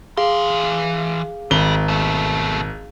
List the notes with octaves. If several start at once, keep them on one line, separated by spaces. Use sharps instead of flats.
E3 G#4 F5 C6
G#1 G3 G7
B2 A3